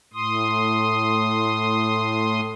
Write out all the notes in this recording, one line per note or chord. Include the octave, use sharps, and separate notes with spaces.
A2 C6 D#6